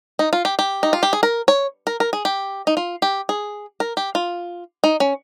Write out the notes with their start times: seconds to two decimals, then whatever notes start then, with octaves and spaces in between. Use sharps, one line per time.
0.19 D#4
0.33 F4
0.45 G4
0.59 G4
0.83 D#4
0.93 F4
1.03 G4
1.13 G#4
1.23 A#4
1.48 C#5
1.87 A#4
2.00 A#4
2.13 G#4
2.25 G4
2.67 D#4
2.77 F4
3.02 G4
3.29 G#4
3.80 A#4
3.97 G4
4.15 F4
4.84 D#4
5.00 C#4